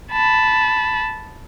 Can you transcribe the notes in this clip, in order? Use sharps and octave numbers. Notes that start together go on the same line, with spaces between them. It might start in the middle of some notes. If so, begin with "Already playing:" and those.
A5 B5